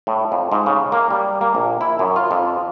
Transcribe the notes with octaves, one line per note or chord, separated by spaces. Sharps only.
A2
F2
G#2
C#3
A#3
G3
A#3
A#1
E4
F#2
F4
F2